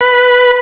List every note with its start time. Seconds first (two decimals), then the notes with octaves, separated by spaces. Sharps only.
0.01 B4